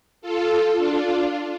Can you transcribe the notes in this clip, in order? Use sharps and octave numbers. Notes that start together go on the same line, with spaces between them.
F4 A4
D4 F4